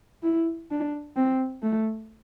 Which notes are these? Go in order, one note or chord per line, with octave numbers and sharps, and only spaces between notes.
E4
D4
C4
A3